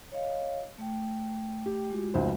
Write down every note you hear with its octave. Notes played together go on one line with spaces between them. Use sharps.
C#5 D#5 F5
A3 G5
G4
G#3 F4 F#4
F1 C#2 C5